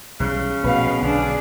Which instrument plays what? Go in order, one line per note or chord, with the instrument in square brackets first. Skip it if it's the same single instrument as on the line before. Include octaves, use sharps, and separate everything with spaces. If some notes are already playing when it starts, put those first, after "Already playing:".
[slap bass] B1 E3 G3 [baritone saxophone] C#3
[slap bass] A#1 E3 A3 [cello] B2 [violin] B4 F5
[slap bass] B1 D3 [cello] D4 [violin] G#4